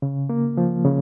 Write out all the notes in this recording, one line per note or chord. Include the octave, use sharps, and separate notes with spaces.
C#3
A#3
F3
C#3